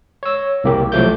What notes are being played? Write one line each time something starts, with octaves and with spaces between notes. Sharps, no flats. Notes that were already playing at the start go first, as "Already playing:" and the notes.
C#5 E6
C2 A#3 G4
C2 F3 F#3 A3 D6 G6